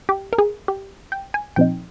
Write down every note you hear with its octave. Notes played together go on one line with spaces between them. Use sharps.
G4
A#4
G#4
G4
G5
G#5
A#2 F3 C4 D#4 G5